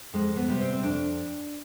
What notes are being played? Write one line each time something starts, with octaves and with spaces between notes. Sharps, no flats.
F2 G#3
B3
C3 G3
C4
C4
F2 D4